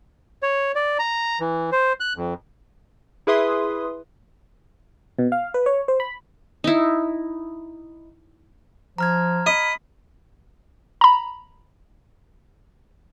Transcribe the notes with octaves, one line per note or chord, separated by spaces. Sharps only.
C#5
D5
A#5
E3
C5
F#6
F2
E4 G#4 B4 E5 C6 D#6
B2
F5
B4
C#5
C5
B5
D#4 E4
F3 A#5 F6 G#6
D#5 B5
A#5 B5